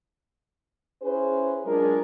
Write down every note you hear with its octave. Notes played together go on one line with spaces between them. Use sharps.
C#4 E4 G#4 B4 C5
F#3 G#3 D4 F4 G#4 A#4